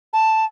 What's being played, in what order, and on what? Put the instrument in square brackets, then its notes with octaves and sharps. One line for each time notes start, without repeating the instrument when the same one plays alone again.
[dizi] A5